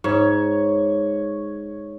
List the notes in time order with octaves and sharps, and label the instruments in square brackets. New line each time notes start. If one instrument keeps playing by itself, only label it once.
[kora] G#2 [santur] C#5